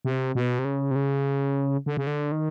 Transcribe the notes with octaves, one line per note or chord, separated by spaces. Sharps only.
C3
B2
C3
C#3
C3
C#3
D3
C#3
D3
D#3